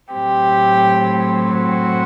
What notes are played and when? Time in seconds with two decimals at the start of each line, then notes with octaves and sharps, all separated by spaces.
0.12 A2 F#3 A3 C4 G4
1.51 F#4